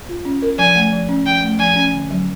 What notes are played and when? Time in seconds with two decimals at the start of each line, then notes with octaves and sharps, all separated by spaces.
0.09 F4
0.25 C#4
0.42 A#4
0.58 F3 G#5
0.76 A3
0.93 F3
1.09 C#4
1.26 F3 G5
1.43 A3
1.59 F3 G#5
1.76 C#4
1.93 D3
2.10 F#3